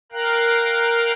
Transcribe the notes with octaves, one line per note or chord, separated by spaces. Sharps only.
A#4 F5 G5 A#5 F#6